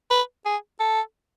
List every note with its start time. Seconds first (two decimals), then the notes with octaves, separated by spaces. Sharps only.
0.11 B4
0.46 G#4
0.80 A4